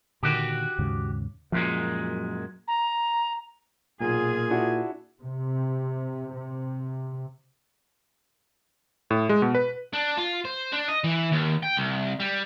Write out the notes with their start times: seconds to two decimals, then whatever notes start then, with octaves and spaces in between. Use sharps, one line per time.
0.23 A#2 D3 D#3 F#4 G4
0.78 D#2 G#2 C#3
1.52 F#2 A#2 F3 F#3 G#3
2.68 A#5
4.01 B1 A#2 F4 G#4 G#5
4.50 D4 E4 F#4
5.22 C3
6.35 C3
9.10 A2
9.29 G#3
9.42 B2
9.55 B4
9.93 D4
10.17 F4
10.45 C5
10.72 D4
10.88 D#5
11.04 E3
11.32 D#2
11.63 G5
11.77 C2
12.20 G3